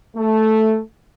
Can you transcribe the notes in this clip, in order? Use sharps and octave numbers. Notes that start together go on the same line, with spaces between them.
A3